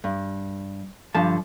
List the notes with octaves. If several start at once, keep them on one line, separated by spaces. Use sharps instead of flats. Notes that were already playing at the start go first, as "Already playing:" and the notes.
G2
G2 D3 F3 A5